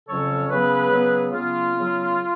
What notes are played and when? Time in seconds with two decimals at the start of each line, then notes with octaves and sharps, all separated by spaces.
0.08 F2 C#3 F#3 C#4 A4 C#5
0.50 C#3 F#3 B3 G#4 B4
0.91 C#3 F#3 B3
1.32 C#3 F#3 B3 F4
1.74 C#3 F#3 B3